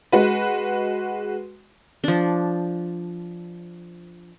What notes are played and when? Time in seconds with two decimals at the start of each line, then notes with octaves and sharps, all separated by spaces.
0.12 G#3 F#4 B4
2.04 F3 D4